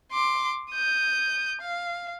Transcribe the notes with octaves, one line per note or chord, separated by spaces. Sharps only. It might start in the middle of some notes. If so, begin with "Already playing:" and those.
C6 D6
D#6 G6
F5